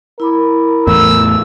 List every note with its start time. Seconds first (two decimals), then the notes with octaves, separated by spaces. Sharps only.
0.20 E4 A#4 B5 D6
0.87 E2 A2 E6